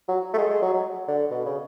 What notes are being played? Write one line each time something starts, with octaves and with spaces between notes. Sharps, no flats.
F#3
A3
G#3
G#3
F#3
F#3
D3
B2
C#3